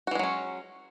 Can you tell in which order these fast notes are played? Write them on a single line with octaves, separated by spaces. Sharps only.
F#4 E3 G#3 F#3 C#4